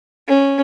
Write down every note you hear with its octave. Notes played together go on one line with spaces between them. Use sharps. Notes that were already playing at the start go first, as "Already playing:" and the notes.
C#4